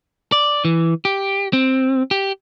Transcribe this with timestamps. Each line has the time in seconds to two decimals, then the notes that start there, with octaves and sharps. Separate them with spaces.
0.32 D5
0.65 E3
1.05 G4
1.53 C4
2.11 G4